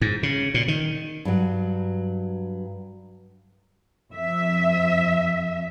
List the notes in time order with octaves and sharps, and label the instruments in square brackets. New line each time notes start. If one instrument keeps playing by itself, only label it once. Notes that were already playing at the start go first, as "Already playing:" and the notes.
[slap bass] G#2
C#3
A#2
D#3
[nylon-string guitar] G2 F#3
[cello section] F2 E5